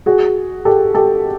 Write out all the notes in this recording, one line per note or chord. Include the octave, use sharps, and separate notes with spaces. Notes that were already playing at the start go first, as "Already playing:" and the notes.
F#4 G#4
G4 A4
G4 A4